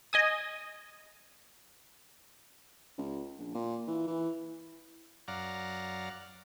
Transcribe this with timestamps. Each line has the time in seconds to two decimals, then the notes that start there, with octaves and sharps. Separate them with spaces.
0.13 D#5 G#5 D#6
2.98 C#2
3.38 A#1
3.55 A#2
3.88 E3
4.08 E3
5.28 F#2 D5 F5 F#5 A#5